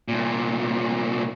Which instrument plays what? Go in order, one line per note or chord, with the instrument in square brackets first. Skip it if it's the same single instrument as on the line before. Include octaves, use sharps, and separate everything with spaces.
[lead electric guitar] C2 A#2